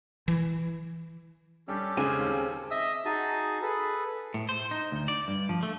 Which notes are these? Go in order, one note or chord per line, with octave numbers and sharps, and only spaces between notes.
E3
G3 C#4 D4 G4 A4
C#3 G#3 C4 G#5 D6 D#7
D#2
D#5 E5 D#6 E6
D#4 F#4 G#4 G#5 A5
G#4 A4 B4
A2
C5
D#4
D2
D5
G2
F3
A3